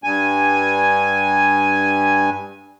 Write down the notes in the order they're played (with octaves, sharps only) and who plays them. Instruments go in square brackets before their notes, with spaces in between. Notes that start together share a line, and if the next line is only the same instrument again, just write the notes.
[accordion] G2 G#5